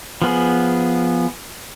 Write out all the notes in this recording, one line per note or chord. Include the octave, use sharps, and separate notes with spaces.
F3 B3 G#4